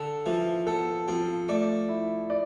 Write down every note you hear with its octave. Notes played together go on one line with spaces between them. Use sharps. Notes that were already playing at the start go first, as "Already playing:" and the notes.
Already playing: D3 A4
E3 F3
B3 A4
F3 C4
A3 D5
E4
D5